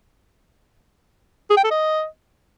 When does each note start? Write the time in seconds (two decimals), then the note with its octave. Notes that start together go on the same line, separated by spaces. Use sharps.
1.50 G#4
1.57 G5
1.64 A4
1.71 D#5